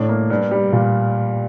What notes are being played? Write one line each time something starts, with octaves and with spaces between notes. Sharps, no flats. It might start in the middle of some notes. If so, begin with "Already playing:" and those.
Already playing: A2 D4
A#3
G2
G3
A#2